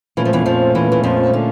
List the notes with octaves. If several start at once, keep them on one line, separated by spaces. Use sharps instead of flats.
A#2 E3 A3 C#4 F4
F3
E2 E3
F2 F3
E2 E3
E3
F2 F3
D3